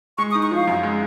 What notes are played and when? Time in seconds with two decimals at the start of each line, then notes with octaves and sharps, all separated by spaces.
0.18 G#3 C#6
0.31 D#6
0.35 D#4
0.43 C#6
0.51 F3 F5
0.68 F#2
0.83 G#3